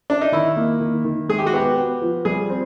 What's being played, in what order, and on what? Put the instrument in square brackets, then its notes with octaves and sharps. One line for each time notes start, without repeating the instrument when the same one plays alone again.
[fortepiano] D4
D#4
[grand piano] D#3 [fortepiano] E4
[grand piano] A#3
D#3
D#3
[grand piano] G#3 [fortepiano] G#4
[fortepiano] G4
F#4
[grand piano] B3 [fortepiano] G4
[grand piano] B3
F3
[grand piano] G3 [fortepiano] G#4
[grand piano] C4